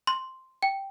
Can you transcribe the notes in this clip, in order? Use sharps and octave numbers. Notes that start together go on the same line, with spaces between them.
C6
G5